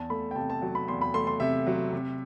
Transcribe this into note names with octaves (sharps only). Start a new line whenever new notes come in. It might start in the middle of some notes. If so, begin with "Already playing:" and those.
Already playing: E2 A5
A3 B5
G5
C3 A5
A5
F#3
B5
E2 C6
B5
A3 C6
C6
C3 E5
F#3
C3